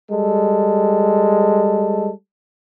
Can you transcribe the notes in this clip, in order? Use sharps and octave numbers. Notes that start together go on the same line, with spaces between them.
G3 G#3 A4